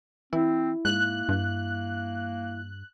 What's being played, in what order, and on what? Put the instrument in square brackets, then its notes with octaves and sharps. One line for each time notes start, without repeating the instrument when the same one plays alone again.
[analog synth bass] E3 [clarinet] C4 [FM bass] E4
[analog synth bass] G#2 [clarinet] A#3 [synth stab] F#6
[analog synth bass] G2